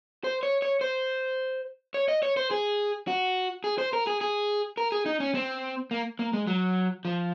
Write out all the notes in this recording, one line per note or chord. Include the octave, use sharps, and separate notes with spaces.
C5
C#5
C#5
C5
C#5
D#5
C#5
C5
G#4
F#4
G#4
C5
A#4
G#4
G#4
A#4
G#4
D#4
C#4
C4
A#3
A#3
G#3
F#3
F3